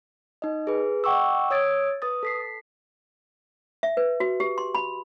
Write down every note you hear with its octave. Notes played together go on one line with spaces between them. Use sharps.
D#4 D#5
G#4 B4
D#5 F#5 G5 C#6 D6 E6
C#5 D#6 E6 G#6 A6 D7
B4 D#6 A6
A4 B6 C7
E5
B4
F#4
G4
C6
B5